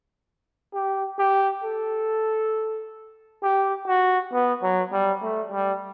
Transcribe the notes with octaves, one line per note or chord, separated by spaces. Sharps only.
G4
G4
A4
G4
F#4
B3
F#3
G3
A3
G3